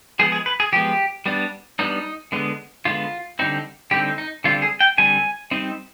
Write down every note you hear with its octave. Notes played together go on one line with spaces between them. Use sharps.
F3 G#3 B3 G#4
G#4
B4
G#4
F3 G#3 B3 G4
G3 B3 D4
G3 B3 D4 D#4
D3 G#3 B3
D3 G#3 B3 F4
D3 G3 C4 D#4
D3 G3 C4 D#4 G4
D#4
D3 G3 C4 F4
G#4
G5
D3 G3 C4 G#5
G3 C4 D#4